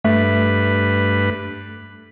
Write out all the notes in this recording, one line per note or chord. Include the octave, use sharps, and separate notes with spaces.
G2 A3 B4